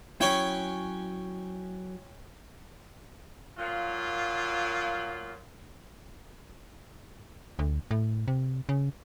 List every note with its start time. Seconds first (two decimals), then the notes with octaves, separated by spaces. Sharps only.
0.21 F#3 C#4 E4 C#5 G5
3.58 A#2 F#3 A#3 F4
7.59 D2
7.91 A2
8.28 C3
8.69 C#3